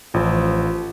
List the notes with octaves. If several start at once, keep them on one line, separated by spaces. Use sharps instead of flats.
A1 F3